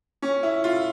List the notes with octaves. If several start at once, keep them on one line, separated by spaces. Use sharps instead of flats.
C#4
E4
F4